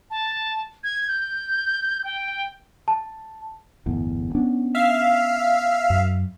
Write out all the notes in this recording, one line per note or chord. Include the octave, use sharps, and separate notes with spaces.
A5
G#6
G6
G5
A5
G1 E2 A2
B3 C#4 D4
E5 F5
F#2